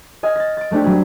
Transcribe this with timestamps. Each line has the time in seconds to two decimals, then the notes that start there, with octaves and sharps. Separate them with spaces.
0.23 D#5 G#5 F6
0.36 A6 A#6
0.57 A6 D7
0.71 G#3 A3 C4 D4 G4
0.84 F#3 G3 G4 G#4